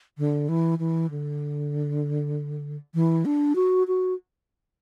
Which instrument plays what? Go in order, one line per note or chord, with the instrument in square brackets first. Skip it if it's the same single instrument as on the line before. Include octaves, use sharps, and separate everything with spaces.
[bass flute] D3
E3
E3
D3
E3
D4
F#4
F#4